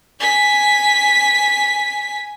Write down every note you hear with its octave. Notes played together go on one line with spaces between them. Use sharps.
G#5 B6